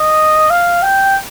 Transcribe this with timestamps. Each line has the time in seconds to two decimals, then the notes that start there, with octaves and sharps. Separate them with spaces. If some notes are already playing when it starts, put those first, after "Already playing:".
Already playing: D#5
0.50 F5
0.83 G5